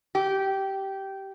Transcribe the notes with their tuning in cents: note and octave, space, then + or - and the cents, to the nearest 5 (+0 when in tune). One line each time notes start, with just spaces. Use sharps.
G4 -15